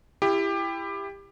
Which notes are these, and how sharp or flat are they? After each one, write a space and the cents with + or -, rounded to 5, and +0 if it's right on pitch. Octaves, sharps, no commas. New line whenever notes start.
E4 +20 G4 +20